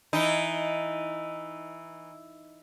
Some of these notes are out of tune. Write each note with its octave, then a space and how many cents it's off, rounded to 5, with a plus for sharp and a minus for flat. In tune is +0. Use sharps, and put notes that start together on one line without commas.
E3 +0 D#4 -5